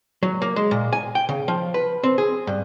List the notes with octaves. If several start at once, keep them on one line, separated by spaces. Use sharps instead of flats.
F#3
A#3
G#3
A#2
G#5
G5
C#3
F3
B4
C4
G#4
G2